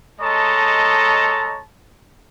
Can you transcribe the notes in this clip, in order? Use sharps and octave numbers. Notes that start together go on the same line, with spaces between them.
G#3 A4 C#5 D#5 A5 A#5